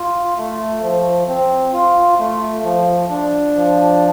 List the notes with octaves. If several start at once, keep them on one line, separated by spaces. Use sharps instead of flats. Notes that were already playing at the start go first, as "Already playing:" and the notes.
Already playing: F4
A3
F3
C4
F4
A3
F3
D4
F3